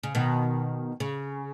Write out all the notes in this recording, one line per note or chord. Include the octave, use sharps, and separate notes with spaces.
C#3
B2 D#3
C#3